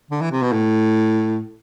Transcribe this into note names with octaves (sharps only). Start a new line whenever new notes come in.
D3
E3
C3
B2
A2